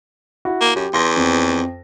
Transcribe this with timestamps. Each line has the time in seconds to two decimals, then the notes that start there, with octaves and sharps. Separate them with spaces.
0.45 E4 F#4
0.61 A#3
0.76 F#2 G4
0.94 E2 C6 A#6
1.17 F2